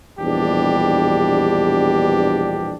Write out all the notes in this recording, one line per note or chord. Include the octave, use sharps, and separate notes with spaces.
A#1 E2 B2 G3 D4 G4